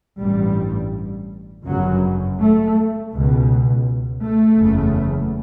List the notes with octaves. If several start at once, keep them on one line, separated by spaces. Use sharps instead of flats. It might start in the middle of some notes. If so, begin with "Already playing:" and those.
A1 G2 G3
G1 F#2 C#3 F#3
A3
C#2 B2
A3
F#1 E2 C#3